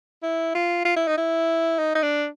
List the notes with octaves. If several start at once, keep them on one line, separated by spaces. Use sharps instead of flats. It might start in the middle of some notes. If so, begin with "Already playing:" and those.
E4
F4
F4
E4
D#4
E4
D#4
D#4
D4